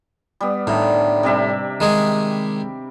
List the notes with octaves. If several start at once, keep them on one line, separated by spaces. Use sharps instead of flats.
G3 B3
A2 D3 D#3
C3 G3 E5
D#3 G#3 G#4